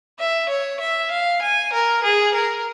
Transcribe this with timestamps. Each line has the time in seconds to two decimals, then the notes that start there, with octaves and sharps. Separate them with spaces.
0.19 E5
0.49 C#5
0.80 E5
1.11 F5
1.42 G#5
1.72 A#4
2.03 G#4
2.34 A#4